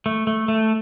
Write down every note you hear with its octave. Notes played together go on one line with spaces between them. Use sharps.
A3
A3
A3